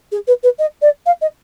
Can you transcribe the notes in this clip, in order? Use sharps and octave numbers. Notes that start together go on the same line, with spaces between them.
G#4
B4
B4
D#5
D5
F5
D#5